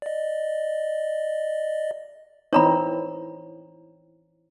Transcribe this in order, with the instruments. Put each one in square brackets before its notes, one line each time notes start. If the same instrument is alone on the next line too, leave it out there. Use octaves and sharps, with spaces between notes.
[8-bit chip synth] D5 D#5
[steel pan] E3 C4 D#4 [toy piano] C#5 A#5 B5